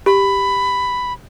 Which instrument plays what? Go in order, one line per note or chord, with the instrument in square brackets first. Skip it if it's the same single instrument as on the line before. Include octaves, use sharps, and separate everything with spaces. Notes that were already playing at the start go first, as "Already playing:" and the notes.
[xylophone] G4 [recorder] B5